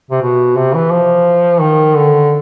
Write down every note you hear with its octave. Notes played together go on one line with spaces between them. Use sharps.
C3
B2
C3
E3
F3
D#3
D3